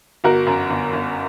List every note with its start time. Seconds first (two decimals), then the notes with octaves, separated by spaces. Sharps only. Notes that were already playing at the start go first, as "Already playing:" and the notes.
0.24 G1 F#4 A#4
0.47 F#2
0.70 G1
0.93 G1